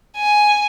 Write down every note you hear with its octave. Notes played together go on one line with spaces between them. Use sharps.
G#5